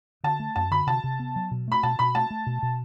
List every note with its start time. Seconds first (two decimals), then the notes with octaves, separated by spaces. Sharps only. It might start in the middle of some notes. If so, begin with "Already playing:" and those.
0.24 D3 A5
0.40 A3
0.56 F#2 A5
0.71 D3 B5
0.87 C3 A5
1.04 C3
1.19 B3
1.36 F#3
1.51 B2
1.68 A3 B5
1.83 B2 A5
1.99 B2 B5
2.15 A3 A5
2.30 A3
2.47 B2
2.63 B2